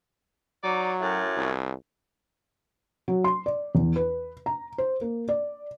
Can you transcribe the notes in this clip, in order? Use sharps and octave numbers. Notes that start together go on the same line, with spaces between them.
F#3 D#4 D5
F#2 A2
C2
F#3
C6
D5
E2
B4
A#5
C5
A#3
D5